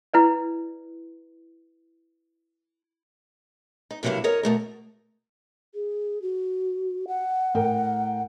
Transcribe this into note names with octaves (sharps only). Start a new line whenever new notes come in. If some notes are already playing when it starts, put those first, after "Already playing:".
E4 B4 D5
D#4
G2 C3 F#3 A#3 E4 F5
A#4 C#5 D#5
B2 A3 A#4
G#4
F#4
F#5
A2 A#4 G5